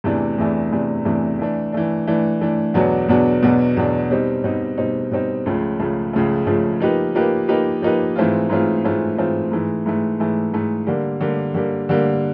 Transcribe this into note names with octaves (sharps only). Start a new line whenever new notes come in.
E2 C3 E3 A3 D4
E2 C3 E3 A3 D4
E2 C3 E3 A3 D4
E2 C3 E3 A3 D4
E3 A3 D4
E3 A3 D4
E3 A3 D4
E3 A3 D4
E2 B2 F#3 B3 D4
E2 B2 F#3 B3 D4
E2 B2 F#3 B3 D4
E2 B2 F#3 B3 D4
B2 G3 C4 D#4
B2 G3 C4 D#4
B2 G3 C4 D#4
B2 G3 C4 D#4
C#2 C#3 F3 A3
C#2 C#3 F3 A3
C#2 C#3 F3 A3
C#2 C#3 F3 A3
F3 A#3 D#4 G4 B4
F3 A#3 D#4 G4 B4
F3 A#3 D#4 G4 B4
F3 A#3 D#4 G4 B4
G#2 E3 A3 C4 F4
G#2 E3 A3 C4 F4
G#2 E3 A3 C4 F4
G#2 E3 A3 C4 F4
G#2 E3 A3
G#2 E3 A3
G#2 E3 A3
G#2 E3 A3
D3 G3 A#3
D3 G3 A#3
D3 G3 A#3
D3 G3 A#3